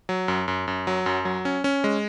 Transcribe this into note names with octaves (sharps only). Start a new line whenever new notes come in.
F#3
F#2
F#2
F#2
F#3
F#2
F#3
C#4
C#4
G#3